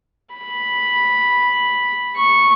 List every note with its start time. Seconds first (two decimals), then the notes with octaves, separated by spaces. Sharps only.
0.35 B5
2.17 C#6